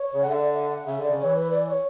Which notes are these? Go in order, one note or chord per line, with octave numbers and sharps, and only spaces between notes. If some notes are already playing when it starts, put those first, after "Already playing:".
Already playing: C#5
C#3
F#5
D3 E5
D5
E5
F#5
C#3 E5
D3 D5
C#3
E3 C#5
B4
D5
C#5